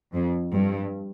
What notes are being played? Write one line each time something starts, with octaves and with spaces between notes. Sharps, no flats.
F2
G2